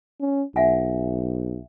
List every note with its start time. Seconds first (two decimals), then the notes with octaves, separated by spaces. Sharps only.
0.20 C#4
0.56 B1 E5 F#5 G#5